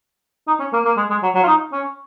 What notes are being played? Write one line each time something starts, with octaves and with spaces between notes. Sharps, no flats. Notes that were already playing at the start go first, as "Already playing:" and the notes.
D#4
C#4
A#3
A#3
G#3
G#3
F#3
F#3
F4
D#4
C#4